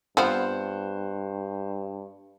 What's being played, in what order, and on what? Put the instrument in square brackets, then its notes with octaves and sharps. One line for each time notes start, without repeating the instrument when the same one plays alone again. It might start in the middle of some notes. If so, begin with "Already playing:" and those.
[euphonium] G2 [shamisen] B3 C4 F4 [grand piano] C5 F#5